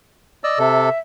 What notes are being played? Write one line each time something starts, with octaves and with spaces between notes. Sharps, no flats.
D5 D#5 E6
C3 A4 E5